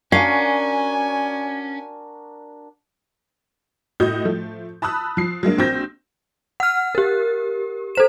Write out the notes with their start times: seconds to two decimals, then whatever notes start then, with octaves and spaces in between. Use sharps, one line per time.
0.12 C#4 D4 F#4 A#4 F5 G#5
4.00 A2 F#4 D#5 G6
4.25 F3 A3
4.82 A5 B5 D#6 E6 F#6
5.17 F3 C7
5.43 F#3 G#3 A#3 D4
5.58 A#1 C4 F#4 G6 A#6
6.60 F#5 F6
6.95 G4 A#4
7.95 A4 C5 E7